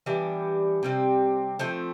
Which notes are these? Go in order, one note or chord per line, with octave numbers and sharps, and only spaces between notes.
E3 G3 B3 D4
C3 G3 C4
F3 A3 C4